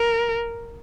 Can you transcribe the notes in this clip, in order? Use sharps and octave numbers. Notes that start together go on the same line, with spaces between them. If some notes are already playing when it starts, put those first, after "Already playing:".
Already playing: A#4